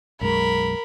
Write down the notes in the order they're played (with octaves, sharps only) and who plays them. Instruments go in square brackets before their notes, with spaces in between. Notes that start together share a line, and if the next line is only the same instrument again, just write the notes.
[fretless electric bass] B1 F#2 G#3 [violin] A#4 B5